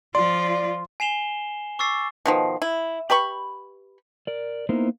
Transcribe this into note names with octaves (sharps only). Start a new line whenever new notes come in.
F3 F4 D5 C6
G#5 C7 E7 F7 G7
C#6 D6 E6 A6 C7
B2 D#3 F3
E4
G4 B4 B5 C#6
A#4 D5
A#3 B3 D#4 E4 A#4 C5